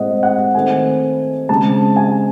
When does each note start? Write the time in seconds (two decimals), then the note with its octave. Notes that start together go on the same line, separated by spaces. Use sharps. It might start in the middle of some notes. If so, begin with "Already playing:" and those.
Already playing: A2 G#3 C4 D#5 F#5
0.23 F#5
0.55 D#3 A3 C4 G#5
1.49 C#3 G#3 C4 A5
1.96 G#5